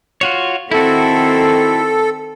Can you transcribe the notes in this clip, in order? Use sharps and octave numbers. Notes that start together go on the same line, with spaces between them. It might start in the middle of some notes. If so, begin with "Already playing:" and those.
F4 F#4 C#5
D#3 C4 E4 F#4 A4